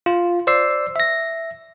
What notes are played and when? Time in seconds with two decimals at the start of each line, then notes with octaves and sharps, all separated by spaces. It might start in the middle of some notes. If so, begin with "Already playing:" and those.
0.06 F4
0.47 C5 D5 E6 C7
0.96 E5 A#6